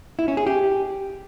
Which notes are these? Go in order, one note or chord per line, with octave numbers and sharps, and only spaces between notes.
E4
C#4
G#4
G4